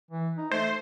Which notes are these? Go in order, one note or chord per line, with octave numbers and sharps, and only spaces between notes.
E3
D#4
A3 C5